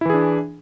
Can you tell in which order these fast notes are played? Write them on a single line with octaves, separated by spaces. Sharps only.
E4 E3 G#4 D4